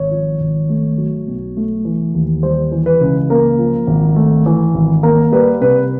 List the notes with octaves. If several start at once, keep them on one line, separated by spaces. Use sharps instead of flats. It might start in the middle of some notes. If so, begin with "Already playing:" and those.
Already playing: G#1 C#5
F3
G#1
A3
F#3
B1
A3
E3
D#2
G3 C5
E3
B4
C#2
A#3 A#4
F3
G#1
A3
E3
G#1
A#3 A#4
G3 B4
C2 B4